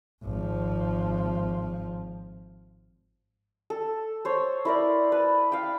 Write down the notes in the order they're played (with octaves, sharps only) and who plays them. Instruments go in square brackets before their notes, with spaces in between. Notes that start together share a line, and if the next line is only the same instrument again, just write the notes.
[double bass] G#1 F3
[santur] A4
C5 C#5
E4 A#4 D5
B4 A5
F5 G5